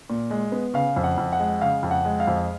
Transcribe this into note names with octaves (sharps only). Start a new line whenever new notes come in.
A#2
G#3
B3
C#3 F5
F2
F#5
F2
F#5
G#3
C#3 F5
F2
F#5
G#3
F5
F2